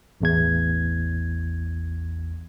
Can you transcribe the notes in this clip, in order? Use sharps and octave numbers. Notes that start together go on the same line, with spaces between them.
A1 E2 G#6